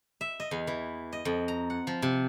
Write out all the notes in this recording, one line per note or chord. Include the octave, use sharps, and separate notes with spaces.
E5
D#5
E2
E3
D#5
F2
A#5
F#5
F3
C3